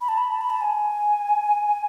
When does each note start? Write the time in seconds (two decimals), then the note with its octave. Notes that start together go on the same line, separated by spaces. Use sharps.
0.01 B5
0.09 A5
0.18 B5
0.32 A5
0.41 B5
0.50 A5
0.61 G#5